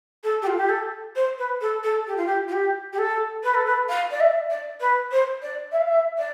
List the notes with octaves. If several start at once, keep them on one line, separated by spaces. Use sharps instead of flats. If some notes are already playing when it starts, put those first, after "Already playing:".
A4
G4
F4
G4
A4
C5
B4
A4
A4
G4
F4
G4
F4
G4
G4
A4
B4
A4
B4
F5
D5
E5
D5
B4
C5
D5
E5
F5
E5
D5